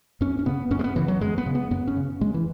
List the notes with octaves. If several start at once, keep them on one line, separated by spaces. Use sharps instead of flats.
F#2 C#4
C#4
C#3 B3
F#2 C#4
G#3
B3
C#3 E3
F#3
F#2 G#3
B3
C#3
B3
F#2 B3
C#4
C#3
F#2 G#3
E3